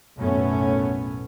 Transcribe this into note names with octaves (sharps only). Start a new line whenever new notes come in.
B1 F#2 A2 A3 B3 C#4